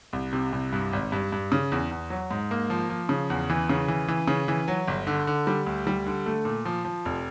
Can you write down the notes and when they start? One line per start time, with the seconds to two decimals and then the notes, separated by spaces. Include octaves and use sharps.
0.13 C2
0.33 C3
0.53 C2
0.73 G2
0.93 G#1
1.12 G2
1.32 G2
1.52 C#3
1.72 E2
1.91 E2
2.10 F#3
2.31 G#2
2.51 A#3
2.70 F3
2.90 F3
3.09 C#3
3.30 E2
3.50 E3
3.69 C#3
3.88 E3
4.08 E3
4.28 C#3
4.48 E3
4.68 F#3
4.88 G1
5.07 D3
5.27 D3
5.47 G3
5.66 D2
5.87 G3
6.07 D3
6.26 A3
6.45 A#2
6.65 F3
6.85 F3
7.05 F1